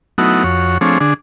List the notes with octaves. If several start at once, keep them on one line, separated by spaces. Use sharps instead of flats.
F#3 A3 B3 D#4 E4 F#4
F2 F#4 C#5
F3 A3 C4 D4 G#4 C#5
D3 D4 G#4